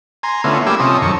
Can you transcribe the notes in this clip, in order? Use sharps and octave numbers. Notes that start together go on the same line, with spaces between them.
G#5 A#5 C6
D3 A3 B3 C#4 E4 F4
G3 A#3 E4 G4 G#5 E6
C3 F3 C#4 A4 D#5
F#2 D#3 A4 C#6